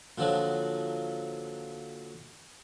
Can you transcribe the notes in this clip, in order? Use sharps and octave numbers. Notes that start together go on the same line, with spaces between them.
A#2 D3 F3 F#3